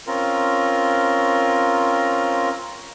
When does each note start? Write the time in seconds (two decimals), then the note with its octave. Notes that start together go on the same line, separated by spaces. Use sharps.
0.07 C4 C#4 F4 A#4